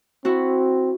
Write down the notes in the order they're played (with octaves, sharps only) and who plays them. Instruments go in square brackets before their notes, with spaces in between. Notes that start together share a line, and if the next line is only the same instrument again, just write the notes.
[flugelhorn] C4 [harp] E4 F#4